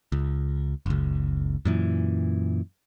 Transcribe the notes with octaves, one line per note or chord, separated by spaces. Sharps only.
C#2
F#1 C#2
F#2 A#2 E3